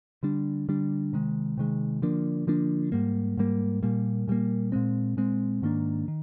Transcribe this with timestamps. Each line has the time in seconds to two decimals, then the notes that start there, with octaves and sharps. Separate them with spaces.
0.23 D3 G3 D4
0.69 D3 G3 D4
1.13 C3 D#3 G#3
1.58 C3 D#3 G#3
2.02 D3 F3 A#3 D4
2.47 D3 F3 A#3 D4
2.92 G#2 G3 A#3
3.37 G#2 G3 A#3
3.83 A#2 G3 A#3
4.28 A#2 G3 A#3
4.72 A#2 G#3 C4
5.17 A#2 G#3 C4
5.62 G#2 D#3 A#3 D4
6.08 D#3